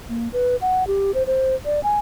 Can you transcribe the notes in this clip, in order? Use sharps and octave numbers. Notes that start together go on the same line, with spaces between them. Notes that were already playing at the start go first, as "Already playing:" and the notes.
A#3
B4
F#5
G4
C5
C5
D5
G#5